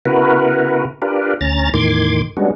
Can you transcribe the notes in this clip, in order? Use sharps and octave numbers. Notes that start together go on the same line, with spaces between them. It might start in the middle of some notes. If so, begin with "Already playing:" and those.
C#3 B3 E4 F#4 A#4 B4
D4 F4 G4 A#4 B4
D2 C#4 A#5 A6
E2 A2 D#3 C6 D6 G#6
G3 G#3 B3 C#4 D4 F#4